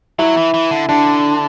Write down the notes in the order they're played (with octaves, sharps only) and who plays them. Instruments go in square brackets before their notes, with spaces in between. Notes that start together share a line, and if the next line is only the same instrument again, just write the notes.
[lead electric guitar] F#3 [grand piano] E4
[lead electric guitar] E3
E3
D3
[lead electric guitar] D3 [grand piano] D4